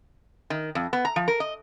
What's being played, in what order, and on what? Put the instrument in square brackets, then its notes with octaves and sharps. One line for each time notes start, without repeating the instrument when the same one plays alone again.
[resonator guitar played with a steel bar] D#3
F2
B3
A#5
F3
A#4
D#5